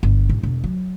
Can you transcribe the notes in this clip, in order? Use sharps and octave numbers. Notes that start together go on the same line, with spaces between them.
G1
A1
E1
F#3